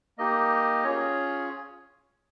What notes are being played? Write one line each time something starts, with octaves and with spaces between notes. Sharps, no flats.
A#3 D#4 G4 D#5
C#4 F4 G#4 C#5